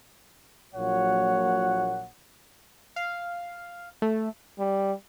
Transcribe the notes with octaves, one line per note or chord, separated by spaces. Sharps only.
A#1 A#2 F#3 C#5 F#5
F5
A3
G3